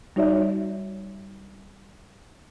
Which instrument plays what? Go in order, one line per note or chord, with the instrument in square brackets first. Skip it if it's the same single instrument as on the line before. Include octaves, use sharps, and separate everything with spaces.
[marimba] G3 D#4 F#4 C#5 D5 E5